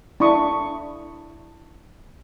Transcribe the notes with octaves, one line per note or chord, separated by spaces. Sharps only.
D4 E4 B5 C#6 D#6